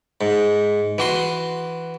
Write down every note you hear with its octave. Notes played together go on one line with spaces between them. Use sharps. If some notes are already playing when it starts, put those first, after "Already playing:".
G#2
E3 F#4 C6